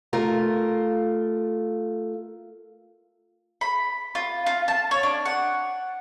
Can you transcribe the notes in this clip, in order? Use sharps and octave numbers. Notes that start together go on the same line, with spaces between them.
A3 F4 A#4
B5
F4
F4
A5
C#5
D4
F#5